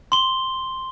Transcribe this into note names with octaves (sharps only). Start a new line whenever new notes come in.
C6 G7